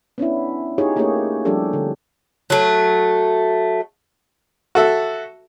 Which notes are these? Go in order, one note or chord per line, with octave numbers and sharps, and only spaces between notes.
B3 C#4 D4 E4
D#4 F4 G4 G#4 C#5
A3 A#3 C#4 G4 G#4 C#5
F3 G3 C#4 D4 G4 A4
D3
F#3 A3
F#4 A4 E5